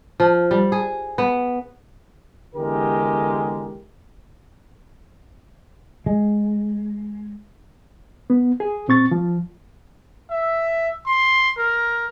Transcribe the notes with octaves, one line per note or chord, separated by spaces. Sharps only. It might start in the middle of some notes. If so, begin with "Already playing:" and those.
F3
G3
G#4
B3
E2 D3 G#3 G4 A#4
G#3
B3
G#4
A#2 C4 C#6 A6
F3
E5
C6
A#4